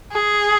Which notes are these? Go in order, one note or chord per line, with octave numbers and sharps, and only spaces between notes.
G#4